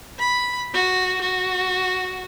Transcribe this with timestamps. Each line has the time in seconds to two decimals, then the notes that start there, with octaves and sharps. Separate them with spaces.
0.19 B5
0.74 F#4
1.22 F#4